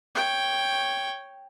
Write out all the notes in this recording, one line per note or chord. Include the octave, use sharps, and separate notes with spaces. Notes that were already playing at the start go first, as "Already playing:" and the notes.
C#5 G5